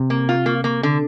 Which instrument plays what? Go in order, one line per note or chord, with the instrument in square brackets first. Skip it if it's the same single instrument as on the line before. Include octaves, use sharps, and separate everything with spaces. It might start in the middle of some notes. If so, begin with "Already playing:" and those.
Already playing: [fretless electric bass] C3
[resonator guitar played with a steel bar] A#3
F4
A#3
A#3
D3